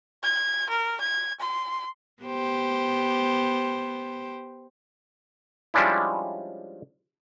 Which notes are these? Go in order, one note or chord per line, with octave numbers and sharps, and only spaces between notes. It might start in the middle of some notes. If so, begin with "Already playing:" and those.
G#6
A#4
G#6
C6
B3 G4 C5
F3 G3 G#3 C#4 D4 E4